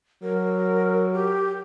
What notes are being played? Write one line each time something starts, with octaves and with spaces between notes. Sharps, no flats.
F#3 A#4
G4